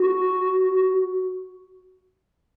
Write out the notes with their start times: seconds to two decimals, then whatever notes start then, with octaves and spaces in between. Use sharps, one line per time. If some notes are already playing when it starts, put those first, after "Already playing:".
Already playing: F#4